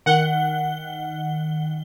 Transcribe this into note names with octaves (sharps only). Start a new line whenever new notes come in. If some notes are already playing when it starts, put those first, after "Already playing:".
D#3 F#5 G7